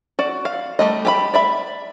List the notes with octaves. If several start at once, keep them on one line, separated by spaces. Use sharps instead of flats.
F#4 D5
F5
G3 A3 D#5
G4 G5 B5
D5 E5 B5